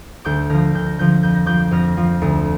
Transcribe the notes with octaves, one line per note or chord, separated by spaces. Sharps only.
D2 D6 G6
D3 F3 F6 A#6
D2 G6
A#6
D3 F3 G6
A#6
F2 G6
A#6
F3 D6 G6
F2 F6 A#6
F3
D2